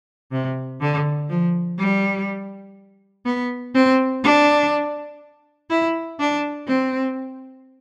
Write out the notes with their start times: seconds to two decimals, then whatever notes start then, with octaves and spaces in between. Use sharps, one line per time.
0.32 C3
0.81 D3
1.29 F3
1.78 G3
3.25 B3
3.74 C4
4.23 D4
5.70 E4
6.20 D4
6.68 C4